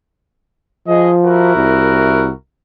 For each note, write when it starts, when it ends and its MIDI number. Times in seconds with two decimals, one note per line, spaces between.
0.88 1.55 53
0.88 1.11 68
0.88 1.11 75
1.23 2.30 64
1.23 2.30 66
1.23 2.30 70
1.56 2.30 36